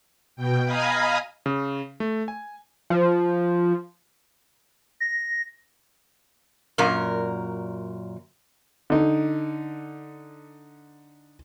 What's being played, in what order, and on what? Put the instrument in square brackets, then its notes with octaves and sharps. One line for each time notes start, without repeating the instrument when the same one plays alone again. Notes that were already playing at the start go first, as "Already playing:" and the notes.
[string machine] B2 G5
D#5 F5 G#5 A#5 B5 D#6
[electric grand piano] C#3
A3
G#5
[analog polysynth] F3
[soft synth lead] A#6
[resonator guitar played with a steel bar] F#2 A#2 A#4
[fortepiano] D3 D#4